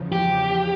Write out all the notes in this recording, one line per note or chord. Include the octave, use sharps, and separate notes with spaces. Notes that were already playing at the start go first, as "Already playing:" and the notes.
Already playing: E2 C#3 F3
G4